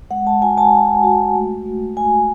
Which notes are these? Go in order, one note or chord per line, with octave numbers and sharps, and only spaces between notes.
G#3 F#5
A5
F#4 G#5
A5
G#3
F#4
A3
A3
A3 G#5